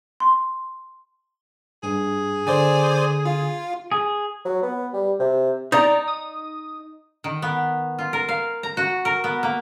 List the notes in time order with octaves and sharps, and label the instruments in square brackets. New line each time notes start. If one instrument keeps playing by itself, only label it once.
[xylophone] C6
[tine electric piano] G2 [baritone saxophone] G#4
[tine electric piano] D3 [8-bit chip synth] C5 D5 G#5
[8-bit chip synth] F4
[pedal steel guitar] G#4
[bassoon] F#3
B3
G3
C3
[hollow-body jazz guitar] D#4 [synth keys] D5 A#5
[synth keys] D#6
[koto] D#3
B3
F4
A#4
F5
A#5
F#4
A#4
B3
A#3